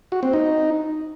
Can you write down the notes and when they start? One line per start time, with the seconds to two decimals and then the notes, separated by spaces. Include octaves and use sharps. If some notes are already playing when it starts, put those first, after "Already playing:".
0.12 F#4
0.23 C4
0.33 D#4